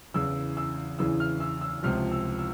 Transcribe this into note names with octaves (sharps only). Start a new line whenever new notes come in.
E2 C#3 E3 E6
E6
E2 C#3 E3 E6
F6
E6
E6
C#2 C3 F3 F6
E6
E6